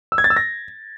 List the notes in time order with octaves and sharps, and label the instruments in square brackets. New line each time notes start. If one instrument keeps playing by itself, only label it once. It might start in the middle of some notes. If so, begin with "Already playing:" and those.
[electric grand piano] E6
G#6
A6
E6
A#6